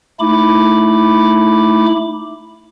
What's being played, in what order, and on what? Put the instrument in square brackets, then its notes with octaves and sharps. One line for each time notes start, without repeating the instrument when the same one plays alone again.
[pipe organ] A3 D#4 E4 B5 D6